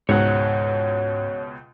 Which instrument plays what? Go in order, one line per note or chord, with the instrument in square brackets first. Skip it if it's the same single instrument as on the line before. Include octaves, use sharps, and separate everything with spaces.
[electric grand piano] C#2 B2 [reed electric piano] G#2 [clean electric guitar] C#5 F#5